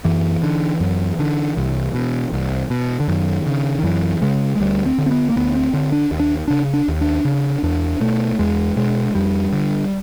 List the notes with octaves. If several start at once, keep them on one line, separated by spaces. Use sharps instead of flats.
F#2 E3
D3
F#2
D3
C2
B2
C2
B2
D3
F#2 D#3
C#3
D#3
F#2 E3
C#3 G#3
G#3
D2 G3
C4
D3
C4
B3
A#3
D2 B3
C4
D3 C4
D4
D#2
D4
C#3 D4
D4
D#2
D4
C#3
E2 D4
B2 A3
E2 G#3
B2 G#3
F2 G3
D3